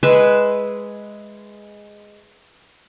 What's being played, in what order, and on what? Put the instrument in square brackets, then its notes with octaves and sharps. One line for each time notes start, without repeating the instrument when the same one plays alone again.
[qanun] G#3 B4 E5